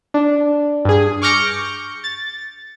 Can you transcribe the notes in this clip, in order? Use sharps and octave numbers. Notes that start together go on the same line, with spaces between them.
D4
G2 G#4
C#6 D6 F6 G6 A#6 C#7
A6